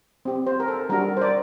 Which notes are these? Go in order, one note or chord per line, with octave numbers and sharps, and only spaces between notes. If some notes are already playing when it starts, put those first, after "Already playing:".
C4 G4
C5
A#4
A4
G3 D4 F#4 A#4
C5
D5